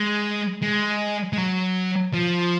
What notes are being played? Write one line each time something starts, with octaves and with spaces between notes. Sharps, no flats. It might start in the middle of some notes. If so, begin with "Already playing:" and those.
Already playing: G#3
G#3
G#3
F#3
F3